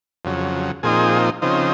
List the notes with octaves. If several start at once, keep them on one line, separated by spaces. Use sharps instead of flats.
F2 C#3 F#3
A#2 F3 C4 D#4 G#4
C#3 F3 C4 D#4